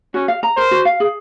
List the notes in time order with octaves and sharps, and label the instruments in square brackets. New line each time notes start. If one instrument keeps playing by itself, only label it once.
[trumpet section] C#4 [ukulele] F#4
[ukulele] F5
A#5
[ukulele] A#4 [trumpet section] C5
[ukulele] F#4
F5
G#4